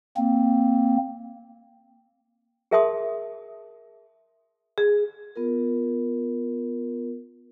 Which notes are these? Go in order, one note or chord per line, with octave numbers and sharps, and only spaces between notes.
A#3 C4
G#4 A#4 E5 A5 C6 D#6
G#4
B3 F4 A#4